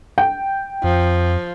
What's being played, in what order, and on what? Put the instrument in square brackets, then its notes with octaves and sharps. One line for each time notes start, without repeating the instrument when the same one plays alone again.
[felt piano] G5
[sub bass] F2 [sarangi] F3